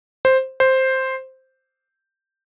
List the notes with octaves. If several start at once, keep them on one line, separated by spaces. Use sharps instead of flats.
C5
C5